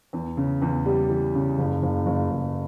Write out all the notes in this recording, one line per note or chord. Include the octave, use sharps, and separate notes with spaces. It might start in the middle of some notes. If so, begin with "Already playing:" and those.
E2
C#3
E2
G3
E3
C#3
F#1
F#1
F#1
F#1